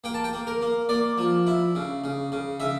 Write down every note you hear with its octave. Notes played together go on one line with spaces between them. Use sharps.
A#3 G5
A5
G5
A#3
A#4
A#3
A#3 D5
F3
E4
C#3
C#3
C#3
C#3 E5